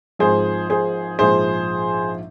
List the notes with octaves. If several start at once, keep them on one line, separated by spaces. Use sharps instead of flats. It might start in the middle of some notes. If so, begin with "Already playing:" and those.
G#1 G#2 F3 G#4 C5
G#4 C5
A#1 G#2 F3 G#4 C5